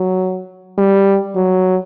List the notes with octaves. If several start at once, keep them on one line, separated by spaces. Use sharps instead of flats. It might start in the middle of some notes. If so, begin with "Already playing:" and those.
Already playing: F#3
G3
F#3